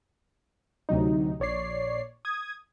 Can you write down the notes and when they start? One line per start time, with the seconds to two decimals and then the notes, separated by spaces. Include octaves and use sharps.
0.89 D2 C3 F#3 D#4
1.40 A#1 C#5 D5 C7
2.25 D#6 G#6